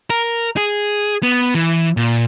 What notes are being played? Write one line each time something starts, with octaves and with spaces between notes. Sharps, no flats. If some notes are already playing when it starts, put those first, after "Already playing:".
A#4
G#4
B3
E3
A#2